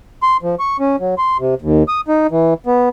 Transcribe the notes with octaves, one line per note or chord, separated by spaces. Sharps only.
C6
F3
C#6
C#4
F#3
C6
C3
D#2
D#6
D#4
E3
B3